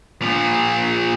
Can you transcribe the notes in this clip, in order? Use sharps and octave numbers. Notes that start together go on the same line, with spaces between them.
A#2 F3